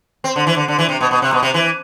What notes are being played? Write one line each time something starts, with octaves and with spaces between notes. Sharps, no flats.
C4
D3
E3
D3
D3
E3
C3
B2
B2
C3
B2
C3
E3